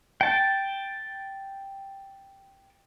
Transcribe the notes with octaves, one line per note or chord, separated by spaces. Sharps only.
G5 A5